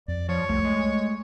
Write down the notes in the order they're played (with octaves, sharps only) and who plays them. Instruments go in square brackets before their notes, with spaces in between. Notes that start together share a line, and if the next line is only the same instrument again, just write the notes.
[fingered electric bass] F2 [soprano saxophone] D5
[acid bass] F3 [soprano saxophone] C#5
[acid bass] C2 [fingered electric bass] A3
[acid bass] G#3